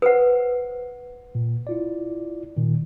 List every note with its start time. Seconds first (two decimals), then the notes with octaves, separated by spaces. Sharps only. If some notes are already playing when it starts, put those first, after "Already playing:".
0.02 B4 C5 F#5
1.35 A#2
1.67 E4 F4 D5
2.57 A#2 D#3